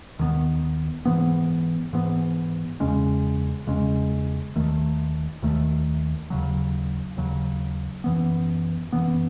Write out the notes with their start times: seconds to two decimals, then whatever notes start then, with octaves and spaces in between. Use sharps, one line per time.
0.19 D#2 D#3 F#3 B3
1.05 G#2 E3 B3
1.93 G#2 E3 B3
2.80 E2 C#3 G#3 C#4
3.67 E2 C#3 G#3 C#4
4.56 D#2 D#3 A3
5.42 D#2 D#3 A3
6.30 D#2 C#3 F#3
7.17 D#2 C#3 F#3
8.04 F#2 E3 B3
8.92 F#2 E3 B3